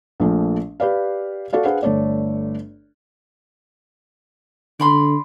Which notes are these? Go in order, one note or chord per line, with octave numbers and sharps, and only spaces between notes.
A#1 A#2 F3 A3
G4 B4 D5 F5
F#4 A4 D5 F5
D4 G#4 B4 C5 F5 F#5
G1 A3 A4 C#5 D5
D3 D5 B5 C6